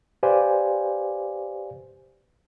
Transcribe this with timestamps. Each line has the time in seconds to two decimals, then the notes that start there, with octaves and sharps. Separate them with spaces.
0.23 G4 B4 C5 D5 F5 G#5